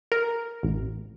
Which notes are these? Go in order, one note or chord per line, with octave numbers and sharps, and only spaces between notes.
A#4
A1